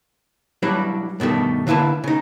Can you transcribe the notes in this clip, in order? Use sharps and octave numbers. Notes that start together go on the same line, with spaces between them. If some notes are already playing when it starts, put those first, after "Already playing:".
F#3 G3 D4 E4 B4
G2 B2 D#3 A3
D3 A#3 E4 B4 A5
C#3 D#4